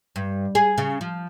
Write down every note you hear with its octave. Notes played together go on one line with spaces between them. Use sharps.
G2
G#4
C#3
F3